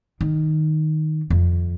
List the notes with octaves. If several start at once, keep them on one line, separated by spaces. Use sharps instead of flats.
D#3
F2